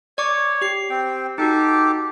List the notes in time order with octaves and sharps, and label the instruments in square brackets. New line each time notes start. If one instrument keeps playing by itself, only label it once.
[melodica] C#5 [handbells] D5 C#6 D6
[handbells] G4 C7
[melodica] C4 G5
[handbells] D#4 F#4 [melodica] G4 A4 D6